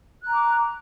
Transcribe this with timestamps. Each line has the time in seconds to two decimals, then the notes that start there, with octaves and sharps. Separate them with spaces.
0.21 F#6
0.26 A#5
0.31 D6